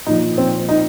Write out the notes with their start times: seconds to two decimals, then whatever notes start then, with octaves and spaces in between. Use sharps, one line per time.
0.07 A#2 F3 D#4
0.38 C4
0.69 D#4